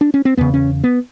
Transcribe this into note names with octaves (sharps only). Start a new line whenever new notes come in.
D4
C#4
C4
E2 C#3 B3
C#4
B3